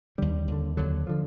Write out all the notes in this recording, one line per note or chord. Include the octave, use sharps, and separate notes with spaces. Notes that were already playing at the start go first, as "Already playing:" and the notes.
D#2 D3 G3
D#2 D3
D#2 D3 F#3
D3 F3